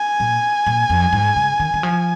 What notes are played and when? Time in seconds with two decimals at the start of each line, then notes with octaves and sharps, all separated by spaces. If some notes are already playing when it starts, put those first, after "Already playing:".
Already playing: G#5
0.20 A#2
0.66 A#2
0.90 F2
1.13 G#2
1.36 C#3
1.60 D#3
1.74 D#3
1.83 F3